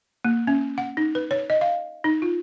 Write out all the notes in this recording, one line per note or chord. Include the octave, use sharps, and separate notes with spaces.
A#3
C#4
F#5
D#4
B4
C#5
D#5
F5
D#4
F4